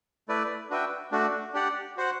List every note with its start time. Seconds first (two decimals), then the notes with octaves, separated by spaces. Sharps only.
0.28 A3 E4 B4 D5
0.70 D4 F#4 B4 E5 G5
1.12 A3 D4 F#4
1.53 D4 G4 D5 F#5
1.96 F#4 C5 F#5